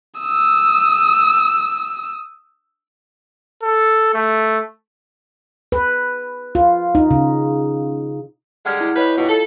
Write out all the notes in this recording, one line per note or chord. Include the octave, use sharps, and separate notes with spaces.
D#6 E6
A4
A3
B4
F4
D#4
C#3
D3 G3 G#3 F#5 F6 G#6
E4
G3 E4 B4 C#5 D#5
G2 B2 F4
A4